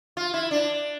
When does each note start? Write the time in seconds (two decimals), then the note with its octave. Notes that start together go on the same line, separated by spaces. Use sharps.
0.17 F4
0.34 E4
0.51 D4